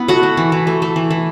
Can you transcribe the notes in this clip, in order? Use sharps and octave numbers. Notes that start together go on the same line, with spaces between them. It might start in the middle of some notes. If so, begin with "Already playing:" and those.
Already playing: B3 E4
A3 F#4 F#5
A3
E3
E3
A3
A3
E3
E3